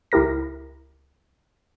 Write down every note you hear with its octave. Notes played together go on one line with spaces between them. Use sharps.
C#2 E4 G4 A#4 A#6